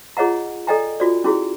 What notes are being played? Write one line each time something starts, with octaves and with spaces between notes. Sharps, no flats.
F4 G#4 C#5 D#5 F#5 A#5
A4 D5 D#5 G5 G#5 A#5
F4 F#4 D5
C#4 E4 F#4 G#4